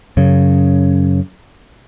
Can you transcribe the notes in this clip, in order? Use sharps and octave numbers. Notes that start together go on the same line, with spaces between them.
F#2 C#3